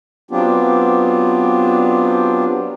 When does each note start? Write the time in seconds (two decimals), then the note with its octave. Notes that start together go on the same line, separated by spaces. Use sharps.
0.31 F#3 B3 C4 D4 F4 G4